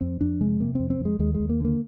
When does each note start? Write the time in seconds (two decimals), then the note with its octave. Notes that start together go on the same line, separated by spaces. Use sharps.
0.01 F2 C4
0.21 F2 D4
0.41 C3 G#3
0.60 C3 A#3
0.75 F2 C4
0.90 C4
1.00 F2 G#3
1.19 D#2 G#3
1.34 G#3
1.40 D#2
1.49 A#3
1.60 D3 A#3